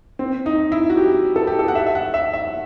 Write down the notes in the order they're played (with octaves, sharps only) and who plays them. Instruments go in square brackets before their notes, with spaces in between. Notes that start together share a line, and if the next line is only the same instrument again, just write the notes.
[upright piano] C4
D#4
E4
F#4
G4
A4
G4
A4
F#5
E5
E5
F#5
E5
E5